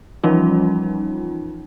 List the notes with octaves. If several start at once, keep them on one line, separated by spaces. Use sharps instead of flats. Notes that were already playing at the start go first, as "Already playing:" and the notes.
E3 F3 G3 C#4 D#4 F4